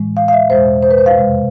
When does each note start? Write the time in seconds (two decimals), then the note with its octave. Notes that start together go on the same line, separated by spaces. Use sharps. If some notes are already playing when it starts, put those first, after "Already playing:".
Already playing: A2 E3 G#3
0.17 F5
0.28 F5
0.33 E5
0.50 E2 B2 G#3 C5
0.83 C5
0.91 B4
0.98 C5
1.06 F5
1.15 F2 C3 G#3